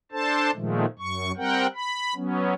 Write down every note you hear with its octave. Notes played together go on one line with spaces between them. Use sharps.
D4 A4 C5 A5
A#2 D#3 F3 G#3 A3
F#2 C#6
G3 C4 A#4 F#5 G5
B5
F#3 B3 C#4